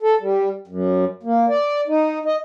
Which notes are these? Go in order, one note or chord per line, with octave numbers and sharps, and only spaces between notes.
A4
G3
F#2
A#3
D5
D#4
D#5